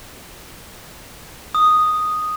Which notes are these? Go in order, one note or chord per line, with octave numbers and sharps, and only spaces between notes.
D#6